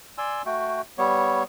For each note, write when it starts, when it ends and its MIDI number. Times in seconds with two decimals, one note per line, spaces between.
0.18 0.42 74
0.18 0.42 80
0.18 0.42 84
0.18 0.42 88
0.46 0.81 57
0.46 0.81 66
0.46 0.81 79
0.98 1.43 55
0.98 1.43 59
0.98 1.43 73